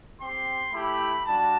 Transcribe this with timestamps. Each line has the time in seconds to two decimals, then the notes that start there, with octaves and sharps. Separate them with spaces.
0.19 C4 G4 C6
0.72 A3 E4 G4 B5
1.25 G3 D4 F#4 A5